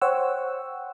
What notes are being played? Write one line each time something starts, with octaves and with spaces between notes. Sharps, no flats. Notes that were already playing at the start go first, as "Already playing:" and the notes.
C5 C#5 F#5 G5 E6